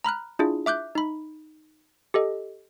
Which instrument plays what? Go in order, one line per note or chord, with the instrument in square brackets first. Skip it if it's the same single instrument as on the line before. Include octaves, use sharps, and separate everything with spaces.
[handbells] A#5 B5 F6 F#6
D4 E4 F4 G#4
E5 D6 F#6 G6
D#4 B5
G4 A4 D#5